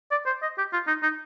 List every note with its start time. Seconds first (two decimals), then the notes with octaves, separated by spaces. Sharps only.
0.11 D5
0.26 C5
0.43 D#5
0.58 G4
0.73 F4
0.88 D#4
1.03 D#4